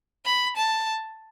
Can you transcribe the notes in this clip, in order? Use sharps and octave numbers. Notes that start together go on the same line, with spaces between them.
B5
A5